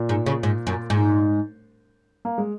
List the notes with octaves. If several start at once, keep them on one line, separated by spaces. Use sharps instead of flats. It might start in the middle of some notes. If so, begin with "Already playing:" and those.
Already playing: A#2
G#2
C#3
G#2
F#2
G#2
A#3
G#3